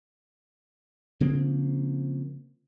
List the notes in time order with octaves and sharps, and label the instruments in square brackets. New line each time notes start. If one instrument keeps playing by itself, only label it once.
[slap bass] C#3 F3 A#3 C4